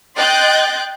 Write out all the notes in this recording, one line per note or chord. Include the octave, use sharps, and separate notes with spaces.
D#5 G5 C6 F#6 G6 A6